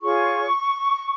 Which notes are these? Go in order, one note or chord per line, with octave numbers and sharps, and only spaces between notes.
F4 G#4 C#5 C#6